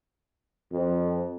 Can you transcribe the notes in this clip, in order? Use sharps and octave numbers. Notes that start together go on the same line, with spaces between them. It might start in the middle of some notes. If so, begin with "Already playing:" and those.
F2